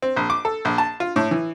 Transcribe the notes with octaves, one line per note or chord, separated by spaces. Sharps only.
C4
A#1
D6
A4
A#1
A5
F4
A2
E3